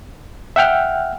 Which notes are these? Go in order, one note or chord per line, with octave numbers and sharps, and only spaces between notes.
E5 F#5 G5 F6